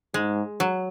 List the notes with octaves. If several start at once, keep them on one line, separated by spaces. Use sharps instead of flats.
G#2 G#3
F#3